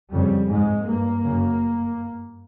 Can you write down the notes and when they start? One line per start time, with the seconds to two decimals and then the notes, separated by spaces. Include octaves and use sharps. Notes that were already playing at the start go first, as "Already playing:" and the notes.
0.12 F2 C#3 G3
0.48 G#2 G#3
0.86 G2 A#3
1.23 F#2 C#3